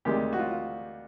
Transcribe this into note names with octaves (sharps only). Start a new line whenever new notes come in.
D2 C3 D#3 G#3 G4
F#4
F4
F4